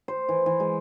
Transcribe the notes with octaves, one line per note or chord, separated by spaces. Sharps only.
C5
E3
E3
G#3